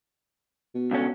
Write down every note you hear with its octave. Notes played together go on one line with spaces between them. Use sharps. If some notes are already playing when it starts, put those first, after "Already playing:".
B2
C#2 D3 C#4